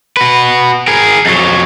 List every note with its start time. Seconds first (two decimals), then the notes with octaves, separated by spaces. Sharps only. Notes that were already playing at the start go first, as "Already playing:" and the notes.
0.17 F#4 B4
0.88 G#4 A#4
1.26 F2 F#3